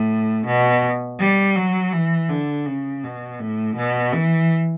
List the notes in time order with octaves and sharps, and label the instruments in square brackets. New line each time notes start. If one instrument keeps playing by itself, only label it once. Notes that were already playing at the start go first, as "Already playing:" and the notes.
Already playing: [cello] A2
B2
G3
F#3
E3
D3
C#3
B2
A2
B2
E3